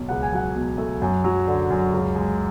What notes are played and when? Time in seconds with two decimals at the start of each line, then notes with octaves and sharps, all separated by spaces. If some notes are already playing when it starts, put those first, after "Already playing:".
Already playing: B1
0.09 C#2 F#5
0.23 G#5
0.33 F#3 F#5
0.55 B2
0.78 A3
1.02 F#2
1.24 F#3
1.47 D3
1.70 F#2
1.93 C#2
2.15 G#3